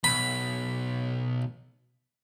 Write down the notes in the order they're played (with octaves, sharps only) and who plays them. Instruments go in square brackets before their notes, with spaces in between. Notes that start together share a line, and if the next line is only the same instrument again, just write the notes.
[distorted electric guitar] B1 [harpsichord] B5